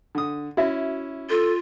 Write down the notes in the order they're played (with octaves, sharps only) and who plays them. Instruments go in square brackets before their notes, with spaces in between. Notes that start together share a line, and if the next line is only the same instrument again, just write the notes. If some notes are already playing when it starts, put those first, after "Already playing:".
[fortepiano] D3 D#6
[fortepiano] C#4 E4 [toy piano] F#4 E5
[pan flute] F4 [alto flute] A4